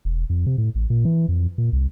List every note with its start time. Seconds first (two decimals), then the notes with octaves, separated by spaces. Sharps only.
0.05 E1
0.30 F2
0.46 C3
0.58 A2
0.75 A1
0.90 A#2
1.05 E3
1.28 F2
1.58 A#2
1.73 C2